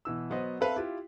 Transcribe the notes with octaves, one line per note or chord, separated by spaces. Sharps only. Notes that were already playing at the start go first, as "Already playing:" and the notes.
B2 E3 E6
F#3 B3 C5 D#5
C4 A4 B4 E5 F5
E4 F4 G4